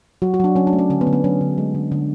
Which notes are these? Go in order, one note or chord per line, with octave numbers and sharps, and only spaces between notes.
F#3 F#4
F#4
F#3 D4
F#3 C#4
D4
A3
C#4
D3 C#4
B3
D3
B3
F#3 C#4
D3
G#3
D3
D3